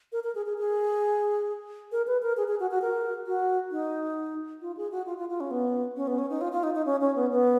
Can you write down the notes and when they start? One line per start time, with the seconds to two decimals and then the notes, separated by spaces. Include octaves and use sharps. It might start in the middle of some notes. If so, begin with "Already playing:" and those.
0.12 A#4
0.24 A#4
0.35 G#4
0.46 G#4
0.58 G#4
1.92 A#4
2.07 B4
2.22 A#4
2.37 G#4
2.48 G#4
2.60 F#4
2.71 F#4
2.82 A#4
3.27 F#4
3.71 D#4
4.62 F4
4.77 G#4
4.91 F#4
5.06 F4
5.18 F4
5.29 F4
5.40 C#4
5.51 B3
5.96 C#4
6.07 B3
6.18 C#4
6.30 D#4
6.41 F4
6.52 F4
6.63 D#4
6.74 D#4
6.86 C#4
7.01 C#4
7.15 B3
7.31 B3